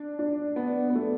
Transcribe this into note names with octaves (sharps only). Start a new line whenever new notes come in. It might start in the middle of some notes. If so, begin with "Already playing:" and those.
Already playing: D4
D4
B3
B3
A3